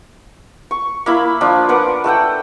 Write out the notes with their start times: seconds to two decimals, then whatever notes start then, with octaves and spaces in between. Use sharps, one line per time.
0.71 C#6
1.06 A#3 E4 B5
1.41 F3 D4 F4 D6
1.69 A#4 B4 F#5 D6
2.04 A3 A4 F#5 G5